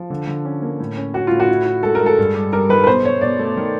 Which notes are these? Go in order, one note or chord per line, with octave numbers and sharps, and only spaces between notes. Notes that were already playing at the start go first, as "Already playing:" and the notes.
Already playing: F3
D3
D3
C#4
A#3
A2
C#4
C#4 F#4
A2 F4
F#4
E4
E4
G#3 A4
A#4
G#3
A4
G2
G3
G3 A#4
D#3 B4
B4
B2 C5
B2 C#5
B2 D5
A3
D#3